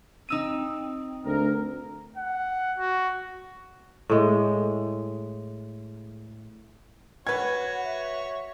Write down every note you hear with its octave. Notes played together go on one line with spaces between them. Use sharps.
C4 D#4 E6 D#7
D2 A#4
F#5
F#4
A2 G#3
F#4 B4 C#5 F#5 G#6
E5